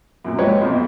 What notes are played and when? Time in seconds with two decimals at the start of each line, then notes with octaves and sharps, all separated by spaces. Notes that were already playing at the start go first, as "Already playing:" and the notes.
0.24 F#2 A#2 F#3
0.38 F3 G#3 G4 B4 C#5 D#5
0.61 B1 F2 B2